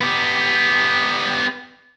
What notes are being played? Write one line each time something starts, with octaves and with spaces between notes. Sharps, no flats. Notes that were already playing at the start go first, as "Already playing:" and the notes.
B3 G4